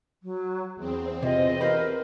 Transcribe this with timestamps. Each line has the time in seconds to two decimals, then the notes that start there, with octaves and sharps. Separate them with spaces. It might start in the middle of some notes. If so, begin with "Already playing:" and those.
0.23 F#3
0.76 E2 C4 G#4
1.23 C3 F4 D#5
1.61 F4 G4 A#4 B4